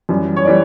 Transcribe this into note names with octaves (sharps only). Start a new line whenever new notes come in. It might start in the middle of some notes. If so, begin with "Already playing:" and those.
F#2 E3 G3
C#5
E3 G3 D5